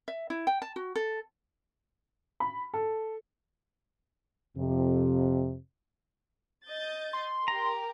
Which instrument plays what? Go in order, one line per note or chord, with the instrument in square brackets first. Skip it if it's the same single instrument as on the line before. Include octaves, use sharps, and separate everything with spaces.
[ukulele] E5
E4
G5
A5
F#4
A4
[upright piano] B5
A4
[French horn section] F2 C3
[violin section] D#5 G6 A6
[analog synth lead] C6
[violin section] G4 A#4 [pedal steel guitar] A#5